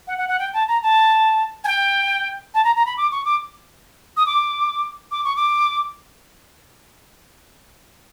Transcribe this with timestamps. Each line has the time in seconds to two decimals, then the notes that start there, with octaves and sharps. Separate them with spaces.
0.07 F#5
0.18 F#5
0.28 F#5
0.39 G5
0.54 A5
0.68 A#5
0.83 A5
1.64 G#5
1.67 G5
2.54 A5
2.64 A#5
2.76 A#5
2.86 B5
2.97 D6
3.12 C#6
3.25 D6
4.17 D#6
4.26 D6
5.11 D6
5.24 C#6
5.36 D6